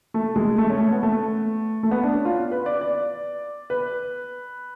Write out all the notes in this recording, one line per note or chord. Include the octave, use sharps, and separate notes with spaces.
A3
G#3
A3
C#4
A3
B3
A3
A3
B3
D4
C#4
F4
B4
D5
D5
B4